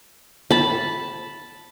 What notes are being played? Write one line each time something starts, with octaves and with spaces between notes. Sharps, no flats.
A5 B5